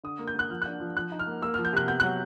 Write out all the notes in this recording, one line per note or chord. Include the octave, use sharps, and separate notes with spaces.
D3 D#6
A#3
G6
A#3 F#6
F3 F6
D4 F#6
F3
F3 F#6
D#4
F6
A#3
A#3 E6
F6
F3
G6
C3 F#6
B3 G6
F#6
F#3